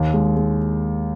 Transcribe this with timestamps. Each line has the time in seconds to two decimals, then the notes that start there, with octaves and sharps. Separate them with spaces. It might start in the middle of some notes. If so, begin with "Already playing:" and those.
Already playing: D#2
0.14 G#3
0.37 G#3